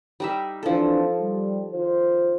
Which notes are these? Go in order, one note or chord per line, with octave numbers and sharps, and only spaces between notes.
G3 D#4 E5
E3 F3 C4 D4 A4
G3
D#3 F4 C5